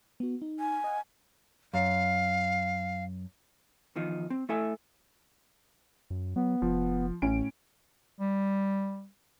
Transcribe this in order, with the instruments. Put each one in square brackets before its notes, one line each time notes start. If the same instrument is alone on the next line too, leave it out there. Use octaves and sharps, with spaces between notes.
[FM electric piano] B3 F#4
D#4
[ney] G#5
[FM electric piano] D#5 F#5
[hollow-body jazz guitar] F#2 [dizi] F5
[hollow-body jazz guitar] E2 D#3 F3 D#4
C4
A3 E4 A4 E5 G#5
[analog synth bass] F#2
[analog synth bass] F#3 [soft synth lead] B3
[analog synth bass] F1 [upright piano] F3
[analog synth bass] A1 [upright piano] A2 C#4 D7
[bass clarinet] G3